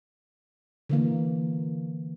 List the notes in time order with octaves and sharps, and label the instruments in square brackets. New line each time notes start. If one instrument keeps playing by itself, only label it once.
[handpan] D3 E3 A#3